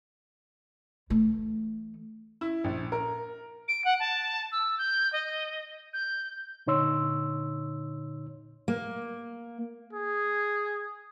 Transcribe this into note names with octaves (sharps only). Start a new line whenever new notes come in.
E3 A3
E4
A#1
A#4
D7
F#5
A5
E6
G6
D#5
G6
A#2 D3 D#4 C#5 C6 E6
A#3
G#4